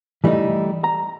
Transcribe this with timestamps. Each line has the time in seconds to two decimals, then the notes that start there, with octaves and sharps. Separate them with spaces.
0.24 E3 G3 A3 D#4 E4
0.84 A#5